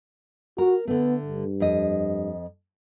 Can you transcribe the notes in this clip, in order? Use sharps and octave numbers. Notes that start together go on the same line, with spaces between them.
F#4 A#4
D3 A3 B3
G2
F2 D#5